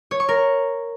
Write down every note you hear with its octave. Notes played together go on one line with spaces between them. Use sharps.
C#5
C#6
A#4